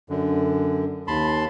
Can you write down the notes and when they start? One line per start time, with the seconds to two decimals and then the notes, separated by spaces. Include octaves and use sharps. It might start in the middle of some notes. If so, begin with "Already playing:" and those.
0.09 F#2 D3
1.07 D#2 A5 B5 C6